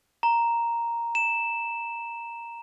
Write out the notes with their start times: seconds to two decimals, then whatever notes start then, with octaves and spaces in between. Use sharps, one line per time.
0.23 A#5
1.15 E7